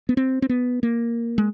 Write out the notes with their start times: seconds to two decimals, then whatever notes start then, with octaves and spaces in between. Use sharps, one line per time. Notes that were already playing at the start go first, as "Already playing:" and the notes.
0.09 B3
0.17 C4
0.42 C4
0.49 B3
0.83 A#3
1.38 G#3